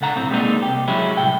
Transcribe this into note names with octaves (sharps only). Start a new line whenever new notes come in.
C#2 D3 F#5 A#5
B1 A2 C4
G3 G#3 A#3 C4 D#4
C2 G4
F#3 G#3 C#4 E4 G4
C2 A2 G5